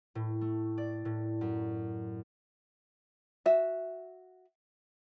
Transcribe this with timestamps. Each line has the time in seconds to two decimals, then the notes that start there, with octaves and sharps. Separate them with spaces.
0.15 A2
0.41 A3
0.78 D5
1.05 A2
1.41 F#2
3.46 F#4 E5